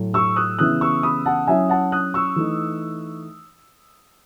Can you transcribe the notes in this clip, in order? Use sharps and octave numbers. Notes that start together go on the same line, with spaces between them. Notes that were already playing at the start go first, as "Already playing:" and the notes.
Already playing: A2 F#3 A3
C#6 E6
D#6 F#6
C#3 E3 B3 E4 D#6 F#6
C#6 E6
B5 D#6
F#5 A5
F#3 C#4 E4 E5 G#5
F#5 A5
D#6 F#6
C#6 E6
E3 A3 D#4